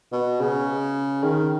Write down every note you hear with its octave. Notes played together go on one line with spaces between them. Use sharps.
B2
C#3
D#3